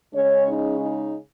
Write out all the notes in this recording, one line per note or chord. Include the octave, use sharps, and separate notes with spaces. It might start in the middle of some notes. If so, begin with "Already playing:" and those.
C#3 G#3 C#4 C#5
D#4
D#4